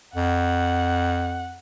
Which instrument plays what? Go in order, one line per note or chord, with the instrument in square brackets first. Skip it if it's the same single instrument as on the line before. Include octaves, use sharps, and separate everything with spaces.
[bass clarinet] F2 [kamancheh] F#5